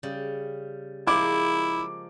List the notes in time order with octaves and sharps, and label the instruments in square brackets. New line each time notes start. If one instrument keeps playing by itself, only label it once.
[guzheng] C#3 G3
[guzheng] F3 G#3 A#3 [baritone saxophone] E4 [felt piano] D6